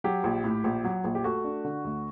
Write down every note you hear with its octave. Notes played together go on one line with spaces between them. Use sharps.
F#3 G4
A#1
A2
A#1
F#3
A#1
G4
A3 F#4
D4
D3
D2